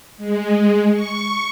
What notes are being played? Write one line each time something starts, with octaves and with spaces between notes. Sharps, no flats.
G#3
C#6